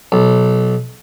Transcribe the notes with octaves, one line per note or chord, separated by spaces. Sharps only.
B1